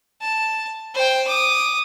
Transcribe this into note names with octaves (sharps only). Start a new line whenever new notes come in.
A5
C5 G5
D6 D#6